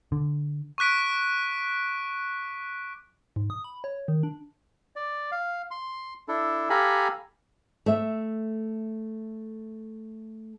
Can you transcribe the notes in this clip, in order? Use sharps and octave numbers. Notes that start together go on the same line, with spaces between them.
D3
C#6 D6 F#6 B6 D7
G#2
D#6
B5
C#5
D#3
D4
D5
F5
C6
D4 E4 A4
G4 A4 F5 G#5 A#5 B5
A3 E5